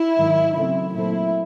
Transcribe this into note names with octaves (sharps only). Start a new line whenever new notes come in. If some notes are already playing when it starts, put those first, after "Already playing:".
Already playing: E4
G#2 D#3 F#3
C#3 F#3 A3 C4 E4
A#2 F#3 A3 C4 E4